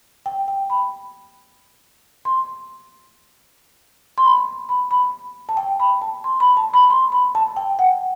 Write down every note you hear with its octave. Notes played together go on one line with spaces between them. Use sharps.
G5
G5
B5
C6
C6
B5
B5
B5
A5
G5
B5
A5
C6
B5
A5
B5
C6
B5
A5
G5
F#5